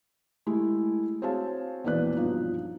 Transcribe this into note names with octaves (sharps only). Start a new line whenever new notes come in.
G#3 A3 E4 G4
C4 F#4 G#4 C#5 F5 A5
E1 A#1 E3 B4 D5 F#6
B1 G2 F3 D#4